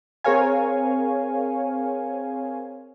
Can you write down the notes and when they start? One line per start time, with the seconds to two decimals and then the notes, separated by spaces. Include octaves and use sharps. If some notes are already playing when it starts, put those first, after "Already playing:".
0.24 C4 G#4 A#4 C#5 F5 G#5